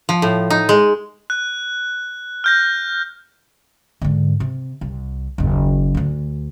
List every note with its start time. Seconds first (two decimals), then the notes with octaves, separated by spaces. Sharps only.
0.09 F3
0.22 A2
0.50 D#4
0.69 G#3
1.30 F#6
2.44 F6 G6 A#6
4.02 G#2 D3
4.40 C3
4.81 C2
5.38 F#1 D#2
5.95 D2 D3